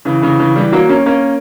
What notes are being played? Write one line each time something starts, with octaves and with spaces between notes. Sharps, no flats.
C#3 E3
C#3 E3
C#3 E3
E3 G3
F#3 A#3
A#3 C#4
A#3 C#4